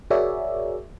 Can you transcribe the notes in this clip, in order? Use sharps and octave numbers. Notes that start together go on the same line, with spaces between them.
F#4 G#4 A#4 C#5 D5 E5